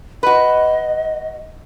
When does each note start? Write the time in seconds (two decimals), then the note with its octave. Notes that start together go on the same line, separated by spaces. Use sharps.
0.23 F#4 B4 D#5